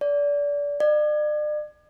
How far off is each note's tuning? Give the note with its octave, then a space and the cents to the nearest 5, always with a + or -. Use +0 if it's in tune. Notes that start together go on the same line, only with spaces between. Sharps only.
D5 -25
D5 +40